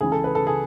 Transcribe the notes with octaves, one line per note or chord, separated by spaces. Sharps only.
C#2 C#3 E3 G#4
A4
B4
A4
G#4